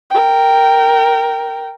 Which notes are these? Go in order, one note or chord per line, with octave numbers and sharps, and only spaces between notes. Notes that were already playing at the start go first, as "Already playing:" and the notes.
A#4 G5